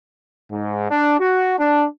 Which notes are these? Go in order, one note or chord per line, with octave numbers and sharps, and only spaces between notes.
G#2
D4
F#4
D4